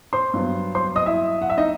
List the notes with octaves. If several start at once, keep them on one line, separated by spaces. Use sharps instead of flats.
C5 C6
G2 F#3 B3
C5 C6
D#5 D#6
E4 E5
F#5
E5
D#4 D#5